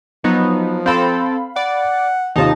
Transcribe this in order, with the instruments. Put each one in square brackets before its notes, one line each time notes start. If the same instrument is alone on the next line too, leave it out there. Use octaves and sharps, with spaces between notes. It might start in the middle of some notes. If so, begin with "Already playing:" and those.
[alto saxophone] F3 [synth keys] F#3 B3 D#4
[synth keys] C4 A4 [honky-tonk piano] F5 B5
[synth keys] D5 [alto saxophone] F#5
[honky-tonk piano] D#2 C3 F4 [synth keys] D#4 A5